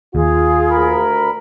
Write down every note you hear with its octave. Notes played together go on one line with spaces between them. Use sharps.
D#2 F4 G#4
D2 A#4 B5